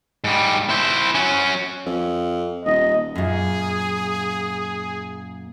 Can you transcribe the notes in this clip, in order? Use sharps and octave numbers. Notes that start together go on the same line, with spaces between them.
G#2 G3
E4 C5
F#3 C#4
F2
D#1 D#5
F#2 A#2 G#4